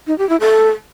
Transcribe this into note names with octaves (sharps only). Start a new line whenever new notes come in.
D#4
G4
E4
A4